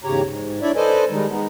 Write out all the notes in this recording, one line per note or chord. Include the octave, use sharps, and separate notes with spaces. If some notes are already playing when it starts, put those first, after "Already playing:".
E2 G#2 C#3 G4 C#5 A#5
G#2
D4 E4 C#5 D5 E5
A4 B4 C5 D5 D#5 G#5
D#3 G3 G#3 D#4
G#3 B3 D#4